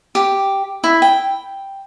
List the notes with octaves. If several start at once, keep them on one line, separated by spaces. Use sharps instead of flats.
G4
E4
G5